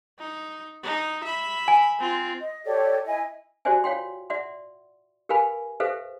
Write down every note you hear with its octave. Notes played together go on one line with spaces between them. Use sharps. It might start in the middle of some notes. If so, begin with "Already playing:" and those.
D#4
D#4
E5 B5
G#5
C4 F4
D#5
G4 A4 C#5 D5
E4 D#5 G#5
F#4 G4 C5 D5 E5 G#5
F4 C#5 F5 G5 C6
D5 E5 F#5 C6
G4 A#4 B4 F5 G#5 B5
G4 A4 B4 C5 E5 F5